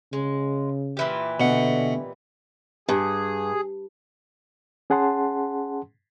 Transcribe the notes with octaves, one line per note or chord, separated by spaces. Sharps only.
C#3 G#3
A#2 E3 G4
B2 D3 F#5
G2 G#4
C#4 G#4 F#5 A5 C6